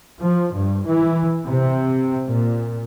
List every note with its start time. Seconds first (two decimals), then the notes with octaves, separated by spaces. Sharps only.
0.20 F3
0.56 G2
0.88 E3
1.48 C3
2.29 A#2